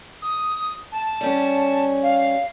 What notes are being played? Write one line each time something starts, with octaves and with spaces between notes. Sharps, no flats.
D#6
A5
G3 C#4
F5